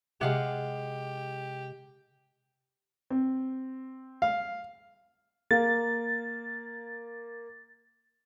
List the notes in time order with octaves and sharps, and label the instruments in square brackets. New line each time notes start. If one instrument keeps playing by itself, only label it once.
[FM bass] C3 [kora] G#3 F5 F#5 [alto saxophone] G4
[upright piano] C4
[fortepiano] F5
[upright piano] A#3 [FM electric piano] A6